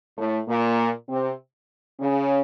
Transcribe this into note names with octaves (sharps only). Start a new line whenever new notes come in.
A2 A3
A#2 A#3
C3 C4
C#3 C#4